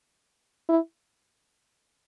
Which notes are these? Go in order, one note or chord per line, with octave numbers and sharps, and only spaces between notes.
E4